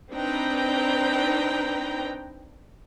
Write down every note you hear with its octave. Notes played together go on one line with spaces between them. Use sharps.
C4 D4 D#4 B4 G5 A#5